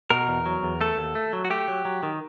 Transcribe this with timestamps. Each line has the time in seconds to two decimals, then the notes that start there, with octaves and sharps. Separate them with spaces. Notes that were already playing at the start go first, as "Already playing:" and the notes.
0.10 B2 A#4
0.28 E2
0.46 F#3
0.63 E2
0.81 A3 A4
0.98 D#2
1.15 A3
1.33 F#3
1.45 F#4
1.50 A3 G4
1.68 F#3
1.85 F#3
2.03 D#3